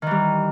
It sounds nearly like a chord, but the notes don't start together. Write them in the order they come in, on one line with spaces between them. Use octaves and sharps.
D#3 E3 G3